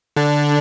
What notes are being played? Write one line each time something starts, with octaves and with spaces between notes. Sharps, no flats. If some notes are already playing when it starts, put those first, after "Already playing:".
D3 D4